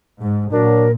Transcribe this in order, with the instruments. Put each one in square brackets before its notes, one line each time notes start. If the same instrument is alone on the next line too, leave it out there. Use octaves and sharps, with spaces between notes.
[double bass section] G#2
[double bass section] A#2 [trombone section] F#3 D4 [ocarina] A#4